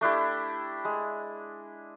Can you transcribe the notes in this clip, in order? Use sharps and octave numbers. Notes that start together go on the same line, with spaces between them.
A3 D4 E4 G4
G#3